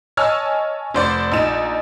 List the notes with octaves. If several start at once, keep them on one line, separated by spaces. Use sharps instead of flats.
C#5 D#5 G#5 A5 E6 F6
F1 C5 D5
A#1 D#4 E7